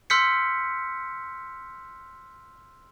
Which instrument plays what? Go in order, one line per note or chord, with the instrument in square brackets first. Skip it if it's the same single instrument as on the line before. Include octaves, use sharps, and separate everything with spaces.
[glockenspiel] C6 E6 F6 G6 B6 C#7